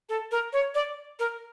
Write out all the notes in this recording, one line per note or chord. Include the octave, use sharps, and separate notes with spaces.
A4
A#4
C#5
D5
A#4